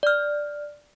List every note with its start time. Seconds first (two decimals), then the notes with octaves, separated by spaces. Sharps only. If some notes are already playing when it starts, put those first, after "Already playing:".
0.03 D5 F6